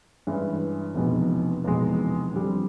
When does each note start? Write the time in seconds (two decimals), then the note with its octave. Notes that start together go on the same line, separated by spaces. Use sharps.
0.27 G2 E3 G#3 C#4 E4
0.95 F1 E2 B2 G#3
1.64 F1 E2 B2 G#3
2.32 F2 D3 G3